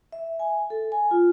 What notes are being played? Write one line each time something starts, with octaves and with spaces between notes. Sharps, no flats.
E5
G#5
A4
G#5
F4